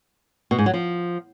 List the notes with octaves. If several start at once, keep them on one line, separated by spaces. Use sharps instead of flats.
B2
G#2
F#3
F3